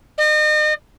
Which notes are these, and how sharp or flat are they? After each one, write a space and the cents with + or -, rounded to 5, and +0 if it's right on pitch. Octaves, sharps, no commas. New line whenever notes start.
D#5 -40